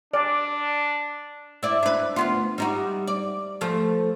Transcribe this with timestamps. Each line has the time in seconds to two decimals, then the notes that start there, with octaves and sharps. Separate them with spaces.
0.14 D4 D5
1.63 E4 D5
1.83 D4 B4
2.16 D2 B3 F4
2.58 G3 D#4 F#4
3.07 D5
3.61 F3 A3